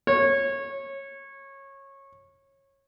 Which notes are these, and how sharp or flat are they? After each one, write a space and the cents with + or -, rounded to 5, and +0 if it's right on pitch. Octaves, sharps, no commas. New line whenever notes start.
C#5 -20